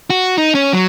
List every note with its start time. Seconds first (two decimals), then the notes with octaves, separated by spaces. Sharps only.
0.10 F#4
0.38 D#4
0.55 C#4
0.73 F#3